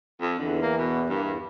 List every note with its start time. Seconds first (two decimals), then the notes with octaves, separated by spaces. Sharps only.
0.21 F2
0.39 E2 D3 E3
0.62 A#3
0.78 B2
1.09 G2 A#3
1.21 E2